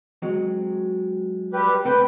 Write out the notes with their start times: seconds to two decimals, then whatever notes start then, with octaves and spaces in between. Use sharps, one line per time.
0.22 F#3 G#3 C4
1.53 G3 G4 B4
1.85 C3 A3 C4 B4 G5